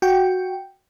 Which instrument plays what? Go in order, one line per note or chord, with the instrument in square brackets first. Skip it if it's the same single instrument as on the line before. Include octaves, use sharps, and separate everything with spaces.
[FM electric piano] F#4 G5